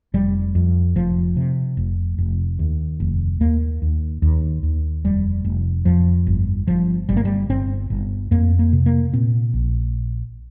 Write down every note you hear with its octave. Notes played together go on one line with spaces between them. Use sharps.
F1 G3
F2
F1 F3
C3
F1
F1
D#2
F1
D#2 A#3
D#2
D#2
D#2
F1 G3
F1
F2 F3
G1
G1 F3
G1 G3
A#3
G3
G1 C4
G1
F2 A#3
A#3
C3
A#3
A#2 C4
A#1